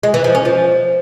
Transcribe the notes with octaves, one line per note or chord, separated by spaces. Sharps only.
G#3
E3
F3
C#4
F3